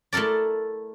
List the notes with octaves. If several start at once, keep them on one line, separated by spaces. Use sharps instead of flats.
A3 E4 A4 A#4 D5